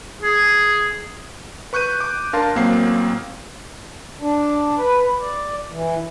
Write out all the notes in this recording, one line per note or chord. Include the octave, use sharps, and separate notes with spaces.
G#4
B4 C#6 F#6 G6 D#7
D6
D4 A#4 F5 A5 C6
A1 F#3 A#3 C4 F5 C7
D4
B4
D5
E3